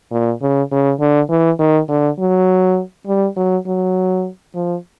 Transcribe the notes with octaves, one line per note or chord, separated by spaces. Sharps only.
A#2
C#3
C#3
D3
E3
D#3
D3
F#3
G3
F#3
F#3
F3